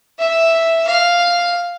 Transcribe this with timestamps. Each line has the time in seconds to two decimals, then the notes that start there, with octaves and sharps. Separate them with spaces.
0.19 E5
0.87 F5